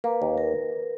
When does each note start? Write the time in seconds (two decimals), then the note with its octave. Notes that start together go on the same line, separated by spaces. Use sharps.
0.04 A#3 B4
0.22 D#2
0.38 A#4